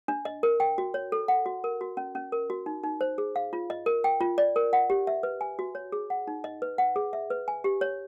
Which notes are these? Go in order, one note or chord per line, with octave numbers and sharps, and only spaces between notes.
D4
D#5
A#4
G5
F#4
C#5
A4
F#5
F#4
A#4
F#4
C#4
C#4
A#4
F#4
D#4
D#4
C5
G#4
F5
F4
D#5
A#4
G5
F4
D5
A#4
F#5
G4
E5
B4
G#5
F#4
C#5
G#4
F#5
D#4
D#5
B4
F#5
G#4
E5
B4
G#5
G4
C#5